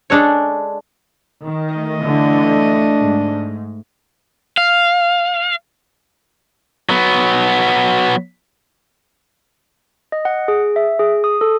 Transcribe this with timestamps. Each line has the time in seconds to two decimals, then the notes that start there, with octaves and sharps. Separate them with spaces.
0.10 G#3 D4 A4 C#5
1.42 D#3
1.74 A3 D#5
2.04 D3 E3 D4
2.98 G#2
4.57 F5
6.89 F#3 B3
10.12 D#5
10.25 F#5
10.48 G#4
10.76 E5
10.99 G#4
11.24 D#6
11.41 A4